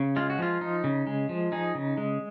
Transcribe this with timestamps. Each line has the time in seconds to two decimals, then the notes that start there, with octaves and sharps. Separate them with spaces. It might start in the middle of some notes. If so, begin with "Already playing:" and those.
Already playing: C#3
0.16 G#3 F4
0.30 F#4
0.39 F3 F4
0.61 D#4
0.84 C#3
1.07 G#3
1.29 F3
1.52 D#4 G#4
1.75 C#3
1.97 G#3